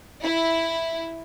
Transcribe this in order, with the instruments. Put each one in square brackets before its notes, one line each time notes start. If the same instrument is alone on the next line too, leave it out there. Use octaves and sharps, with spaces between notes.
[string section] E4